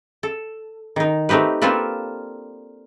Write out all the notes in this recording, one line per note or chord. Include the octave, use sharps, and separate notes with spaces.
A4
D#3 D#4
A3 C4 D#4 G4 B4
A#3 C4 D4 F4 A4 B4